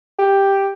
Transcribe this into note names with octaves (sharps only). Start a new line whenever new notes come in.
G4